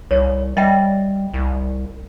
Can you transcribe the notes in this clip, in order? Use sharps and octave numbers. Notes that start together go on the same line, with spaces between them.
C2 C#5
G3 D#5 E5 G5
C2